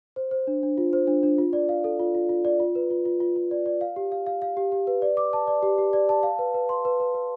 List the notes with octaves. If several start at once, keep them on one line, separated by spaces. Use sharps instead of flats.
C5
C5
D4
D4
F4
C5
D4
D4
F4
D5
F5
A4
F4
F4
F4
D5
F4
B4
F4
F4
F4
F4
D5
D5
F5
G4
F5
F5
F5
G4
G4
B4
D5
D6
A5
D5
G4
G4
D5
A5
F5
B4
B4
C6
B4
B4
B4